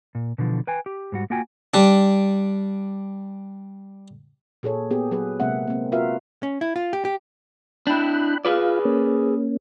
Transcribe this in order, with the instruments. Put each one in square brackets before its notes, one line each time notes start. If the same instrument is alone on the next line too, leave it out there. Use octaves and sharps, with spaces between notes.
[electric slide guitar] A#2
B2 D3 E3 F3
B4 G5 G#5
G4
G#2 G3 F#4
A#3 F4 F#4 G5 G#5
[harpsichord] G3 D4
[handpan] A#2 G#4 A4 C#5
B3 G4 G#4
F#3 G#4 B4
C3 G#3 A#3 C4 E5 F#5
A#3 C4
F4 F#4 A#4 B4 E5 F5
[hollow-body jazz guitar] C#4
E4
F4
G4
G4
[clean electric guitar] D4 E4 [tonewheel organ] G5 B5 F#6
[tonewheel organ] F4 F5 [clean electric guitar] G#4 B4 D5
[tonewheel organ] A#3 C#4